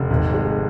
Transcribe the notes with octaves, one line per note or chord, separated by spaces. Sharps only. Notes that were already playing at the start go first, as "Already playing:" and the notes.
Already playing: F1
G#1
G#3